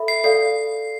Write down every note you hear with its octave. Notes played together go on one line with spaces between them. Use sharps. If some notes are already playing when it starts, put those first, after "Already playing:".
Already playing: A4 E5 B5
C7
A4 D5 F5 C7